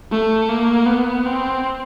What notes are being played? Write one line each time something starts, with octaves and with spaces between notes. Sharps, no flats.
A3
A#3
B3
C4